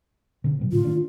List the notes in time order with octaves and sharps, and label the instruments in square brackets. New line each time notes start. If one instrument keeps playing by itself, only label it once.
[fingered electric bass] B2 D3
G#2 B2 F#3
[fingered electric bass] A2 D3 G3 [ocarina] F4
[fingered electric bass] D#3 A#3 D4